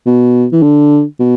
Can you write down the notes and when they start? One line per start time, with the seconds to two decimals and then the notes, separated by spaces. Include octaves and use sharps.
0.06 B2
0.52 E3
0.62 D3
1.20 B2